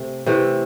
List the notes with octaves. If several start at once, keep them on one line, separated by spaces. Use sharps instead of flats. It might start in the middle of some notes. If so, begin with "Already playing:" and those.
Already playing: C3 A3
C3 E3 A3